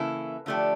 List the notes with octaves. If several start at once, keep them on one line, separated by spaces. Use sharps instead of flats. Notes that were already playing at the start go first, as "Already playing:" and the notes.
Already playing: C#3 E3 A#3 E4 A4
D3 F3 A3 D4 G4